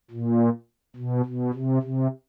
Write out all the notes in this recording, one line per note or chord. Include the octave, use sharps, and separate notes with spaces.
A#2
B2
B2
C3
C3